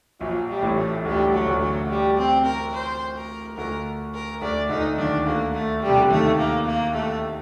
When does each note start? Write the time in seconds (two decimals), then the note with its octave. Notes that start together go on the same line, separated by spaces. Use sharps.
0.20 A#1 A#2 F#3
0.48 G3
0.62 A1 A2
0.78 A3
1.05 D2 D3 G3
1.33 F#3
1.47 D2 D3
1.61 F#3
1.90 G3
2.18 C4
2.46 A#4
2.73 C5
3.16 A#4
3.57 D2 D3 A#4
4.14 A#4
4.41 D2 D3 D5
4.70 D2 D3 D#4
4.98 D#2 D#3 D4
5.26 D2 D3 A#3
5.55 A3
5.82 G3
5.88 C3
5.98 D3
6.10 D#2 D#3 A3
6.39 A#3
6.67 A#3
6.94 A3